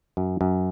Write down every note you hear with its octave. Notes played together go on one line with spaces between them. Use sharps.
F#2
F#2